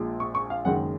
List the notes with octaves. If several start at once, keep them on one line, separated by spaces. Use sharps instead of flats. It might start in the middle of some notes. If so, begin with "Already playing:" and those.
Already playing: A#1 A#2 G#3
C#6
C#6
F5
F#1 F#2 D#3 G#3 F#5